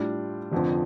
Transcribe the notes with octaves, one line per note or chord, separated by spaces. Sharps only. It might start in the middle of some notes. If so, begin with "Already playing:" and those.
Already playing: A2 G3 D4 F4
F1 F2 D3 F3 C4